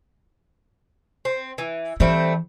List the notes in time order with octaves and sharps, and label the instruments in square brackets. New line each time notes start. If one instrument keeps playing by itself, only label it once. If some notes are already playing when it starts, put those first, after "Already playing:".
[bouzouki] C4
E3
[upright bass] E3 [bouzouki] G3 A3 C4